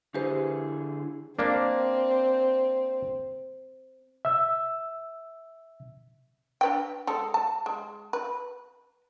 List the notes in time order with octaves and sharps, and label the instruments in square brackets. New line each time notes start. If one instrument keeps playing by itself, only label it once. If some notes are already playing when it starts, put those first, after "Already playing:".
[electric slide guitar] D3 E4 G#4 [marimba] G4 B4 C5
[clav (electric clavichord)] A#3 D4 [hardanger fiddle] C4
[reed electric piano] E5 E6
[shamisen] D4 B4 G5
G#3 A4
A5
G#3
B4